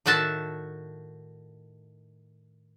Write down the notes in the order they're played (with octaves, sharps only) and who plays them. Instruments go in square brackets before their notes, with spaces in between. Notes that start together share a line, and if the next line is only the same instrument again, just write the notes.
[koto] A2 D#3 F#4 E5 A5